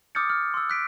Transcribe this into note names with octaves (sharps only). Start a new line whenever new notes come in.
D6 D#6 F6 G6 A6 C#7
F6
C6 E6
F#6 B6 D7